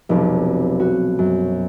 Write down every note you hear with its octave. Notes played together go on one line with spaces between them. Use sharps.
F1 B1
F#4
F#2